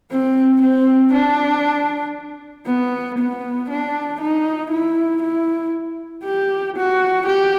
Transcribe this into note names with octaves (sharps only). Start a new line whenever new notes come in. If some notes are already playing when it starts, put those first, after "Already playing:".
C4
C4
D4
B3
B3
D4
D#4
E4
E4
G4
F#4
G4